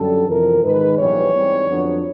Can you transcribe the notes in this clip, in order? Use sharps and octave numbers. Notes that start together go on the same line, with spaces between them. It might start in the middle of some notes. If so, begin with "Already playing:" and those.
Already playing: F#2 D3 G3 A4
F2 C3 E3 A#4
G#2 D#3 G#3 B4
A#1 G#2 E3 G3 B3 C#5
G#2 E3 G3 C4
F2 D3 F#3 B3 D4